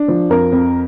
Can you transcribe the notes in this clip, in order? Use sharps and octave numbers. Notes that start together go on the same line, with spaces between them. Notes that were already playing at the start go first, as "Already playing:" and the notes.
Already playing: D4
F3
F2 A#4
F2